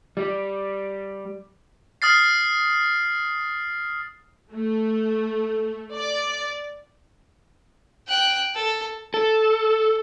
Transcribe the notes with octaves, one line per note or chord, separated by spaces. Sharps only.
G3
D#6 F6 A6 C7
A3
D5
G5 F#6
A4
A4